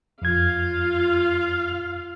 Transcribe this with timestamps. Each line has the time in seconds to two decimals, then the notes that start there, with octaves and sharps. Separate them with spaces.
0.22 F2 F4 F5 G#6